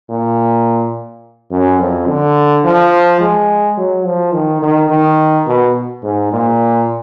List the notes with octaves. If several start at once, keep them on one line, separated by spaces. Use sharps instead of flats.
A#2
F#2
F2
D3
F3
G#3
F#3
F3
D#3
D#3
D#3
B2
G#2
A#2